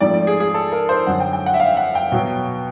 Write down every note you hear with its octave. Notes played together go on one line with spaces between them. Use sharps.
G#2 F3 A3 C4 D5
D5
G#4
G#4
A4
A#4
C5
F#2 D3 F#3 F#5
G5
G5
F#5
E5
F5
F#5
G5
B2 F#3 B3